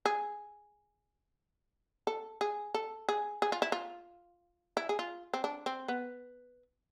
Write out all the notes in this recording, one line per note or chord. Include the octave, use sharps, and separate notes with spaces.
G#4
A4
G#4
A4
G#4
G#4
F4
E4
F4
E4
G#4
F4
C4
D4
C4
B3